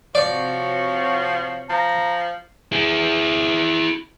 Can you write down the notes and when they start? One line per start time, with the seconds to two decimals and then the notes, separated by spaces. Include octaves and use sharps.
0.15 C3 F3 F#4 C#5 D5
1.69 F3 A#5
2.72 E4 G#4